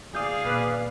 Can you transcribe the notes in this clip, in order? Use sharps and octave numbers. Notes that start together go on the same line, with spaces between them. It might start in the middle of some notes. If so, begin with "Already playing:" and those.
G#4 D5 F5 D#6 G6
A#2 A#3 B4